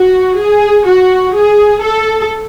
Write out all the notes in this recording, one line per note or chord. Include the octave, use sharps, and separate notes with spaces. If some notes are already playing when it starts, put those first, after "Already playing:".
Already playing: F#4
G#4
F#4
G#4
A4